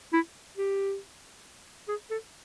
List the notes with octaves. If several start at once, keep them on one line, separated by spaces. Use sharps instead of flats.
E4
G4
G#4
A4